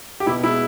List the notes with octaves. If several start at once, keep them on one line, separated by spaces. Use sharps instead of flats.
G4
B2 E4
G#3 B3 E4